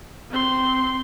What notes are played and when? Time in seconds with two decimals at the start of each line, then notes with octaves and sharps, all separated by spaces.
0.31 C4 C6